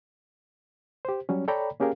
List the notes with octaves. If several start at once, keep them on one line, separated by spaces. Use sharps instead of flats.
G4 C5
F#3 G3 C#4
A4 C#5 D5 G5 A#5 B5
A#3 C#4 G4 G#4 A#4 F5